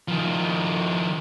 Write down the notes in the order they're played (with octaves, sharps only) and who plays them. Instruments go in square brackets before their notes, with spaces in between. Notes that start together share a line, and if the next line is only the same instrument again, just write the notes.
[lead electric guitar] D#3 F3